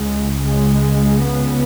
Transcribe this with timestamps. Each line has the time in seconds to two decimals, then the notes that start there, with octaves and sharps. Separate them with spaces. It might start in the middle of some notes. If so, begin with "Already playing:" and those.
Already playing: C#2 C#3 G#3
0.45 G#3
1.25 B3